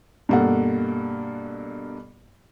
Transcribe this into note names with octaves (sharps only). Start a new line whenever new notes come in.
G2 B2 A#3 A4 F#5